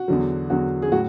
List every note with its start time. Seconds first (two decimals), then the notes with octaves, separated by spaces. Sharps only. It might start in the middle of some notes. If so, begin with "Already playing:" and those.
Already playing: F#4
0.08 E2 D3 F#3
0.50 E2 D3 F#3 F#4
0.82 G#4
0.92 A2 F#3 F#4